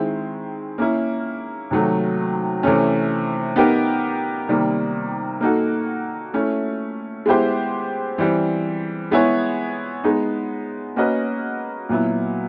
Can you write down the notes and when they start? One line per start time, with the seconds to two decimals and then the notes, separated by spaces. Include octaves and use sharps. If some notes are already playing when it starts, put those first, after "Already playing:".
Already playing: D#3 G#3 C4 E4
0.78 A#3 C#4 E4
1.71 C3 D#3 F#3 A3
2.63 C3 E3 A3 C#4
3.56 B3 D#4 G4 A#4
4.48 C3 D#3 G3 A#3
5.41 A#3 D#4 F#4 A4
6.34 A3 C#4 E4
7.26 G#3 B3 E4 G4 C5
8.18 E3 G3 C4
9.11 G#3 B3 E4 G#4 C#5
10.04 G#3 B3 D#4
10.96 A#3 C#4 F#4 B4 D#5
11.89 A#2 F#3 B3 E4